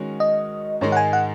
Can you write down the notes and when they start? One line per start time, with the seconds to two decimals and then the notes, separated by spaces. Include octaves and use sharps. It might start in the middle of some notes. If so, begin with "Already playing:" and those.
Already playing: D#3 G#3 C#4 F#4 A#4
0.20 D#5
0.81 G#2 D#3 G#3 D#4 C#5
0.92 F#5
0.97 G#5
1.13 F#5